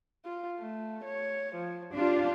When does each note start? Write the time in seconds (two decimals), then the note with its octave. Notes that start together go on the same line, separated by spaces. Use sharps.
0.25 F4
0.59 A3
1.04 C#5
1.55 F3
1.94 D4 F4 G4